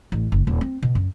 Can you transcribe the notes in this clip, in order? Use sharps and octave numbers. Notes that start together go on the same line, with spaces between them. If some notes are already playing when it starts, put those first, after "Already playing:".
A1
F#1
D#1
C4
B2
F#2